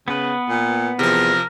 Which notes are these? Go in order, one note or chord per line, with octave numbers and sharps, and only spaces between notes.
C#3 B3 B4
A#2
E2 C3 F3 A#4